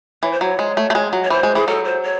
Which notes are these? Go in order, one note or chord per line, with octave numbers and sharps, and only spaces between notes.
E3 C#5
C5
F#3 C#5
G#3
A3
A3
G#3
F#3
C#5
E3 C5
G#3
E3 G#4
F#3 A4
C5
C#5